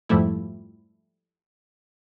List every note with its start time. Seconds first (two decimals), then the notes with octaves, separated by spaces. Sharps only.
0.09 F2 G#2 F3 G3 A3 E4